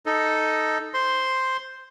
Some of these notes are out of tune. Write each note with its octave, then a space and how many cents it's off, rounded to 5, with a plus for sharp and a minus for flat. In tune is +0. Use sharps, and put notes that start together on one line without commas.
D#4 +0 A4 +0 D#5 +0
C5 +0 C6 +0